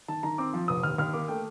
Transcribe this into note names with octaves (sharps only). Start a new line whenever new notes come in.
D#3 A5
D#3 A#5
C4 D6
F3
F1 D#6
D#2 F6
D#2 F6
A#3 D6
A3 G5